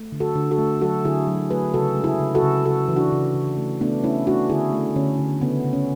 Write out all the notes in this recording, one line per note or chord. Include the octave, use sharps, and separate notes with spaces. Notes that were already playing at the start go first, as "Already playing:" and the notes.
Already playing: A3
D3
F#4 A4
D3
F#4 A4
A3
F#3 F#4 A4
D3 E4 G#4
F#3
A3 G#4 B4
C#3 F#4 A4
G#3
E4 G#4
C#3
F#4 A4
C#3
C#3 F#4 A4
E3
D4 F#4
C#3
C#3
A3
A3 B3 D4
A3 C#4 E4
A3 D4 F#4
D3 E4 G#4
A3
D3 C#4
D3
C#3 B3
C#3
C#4